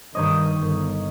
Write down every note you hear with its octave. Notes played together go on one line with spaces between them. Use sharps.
G2 D#3 D#4 C#5 D#5
G1